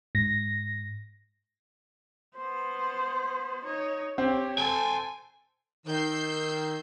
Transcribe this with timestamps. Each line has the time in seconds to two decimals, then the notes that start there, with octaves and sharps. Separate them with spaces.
0.15 G#2 A#6
2.36 B3 C5
3.64 D#4 C#5
4.18 C4 G4 C#5
4.58 A4 C5 G5 G#5
5.87 D#3 E6 G6 C7